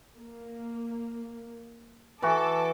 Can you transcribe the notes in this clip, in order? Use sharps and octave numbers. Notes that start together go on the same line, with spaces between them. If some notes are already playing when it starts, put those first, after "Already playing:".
A#3
E3 F#4 A4 D6